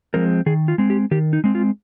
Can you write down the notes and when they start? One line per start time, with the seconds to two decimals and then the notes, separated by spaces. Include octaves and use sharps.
0.14 F3 G#3 C4 A#4
0.46 D#3 G#4
0.68 F4
0.78 G#3 C4
0.90 G4
1.11 D#3 G4
1.33 D#4
1.44 G#3 C4
1.55 F4